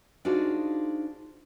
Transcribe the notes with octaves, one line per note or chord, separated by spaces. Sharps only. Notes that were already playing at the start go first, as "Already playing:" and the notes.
D4 D#4 F4 F#4 G#4 C5